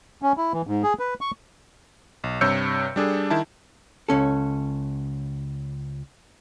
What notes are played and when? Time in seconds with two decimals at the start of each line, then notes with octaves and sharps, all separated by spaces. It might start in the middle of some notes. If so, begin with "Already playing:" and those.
0.22 C#4
0.37 E4
0.53 E3
0.67 G#2
0.83 G#4
0.99 B4
1.21 C#6
2.24 B1
2.41 G2 C3 C#5 E6 G6 C#7
2.96 G3 D4 G#4 A4
3.30 D#3 E4 A5
4.09 C#2 C#4 A4